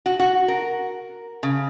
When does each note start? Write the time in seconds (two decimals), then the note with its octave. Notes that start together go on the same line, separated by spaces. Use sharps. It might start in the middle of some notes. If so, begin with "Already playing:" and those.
0.06 F#4
0.19 F#4
0.48 A#4
1.43 C#3